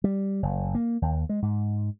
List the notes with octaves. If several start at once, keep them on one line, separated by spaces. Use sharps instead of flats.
G3
F#1
A#3
D#2
G#3
G#2